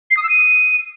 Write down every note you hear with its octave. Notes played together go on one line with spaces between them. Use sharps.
C7
D#6
E6
D#7